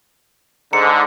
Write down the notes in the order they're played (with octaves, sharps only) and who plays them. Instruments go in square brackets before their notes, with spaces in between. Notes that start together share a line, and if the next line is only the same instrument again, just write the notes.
[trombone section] G#2 D3 [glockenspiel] A#5 C#7